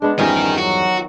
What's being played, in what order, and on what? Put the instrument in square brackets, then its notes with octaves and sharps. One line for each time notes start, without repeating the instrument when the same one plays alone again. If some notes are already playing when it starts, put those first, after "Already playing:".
[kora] G#3 B3 [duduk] D4
[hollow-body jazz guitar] E2 G2 [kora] D#3 F3 G3 [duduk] C#4 [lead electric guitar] D#4 A#4
[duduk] F#3 [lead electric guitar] F#4